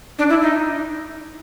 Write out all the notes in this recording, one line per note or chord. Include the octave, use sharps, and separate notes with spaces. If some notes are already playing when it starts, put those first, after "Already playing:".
D4
E4
D#4